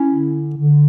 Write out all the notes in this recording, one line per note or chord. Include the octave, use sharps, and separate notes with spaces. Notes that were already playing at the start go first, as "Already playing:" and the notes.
Already playing: C#4 E4
D3
D3